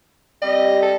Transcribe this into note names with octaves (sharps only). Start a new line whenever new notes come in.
G3 C4 G4 D#5
A4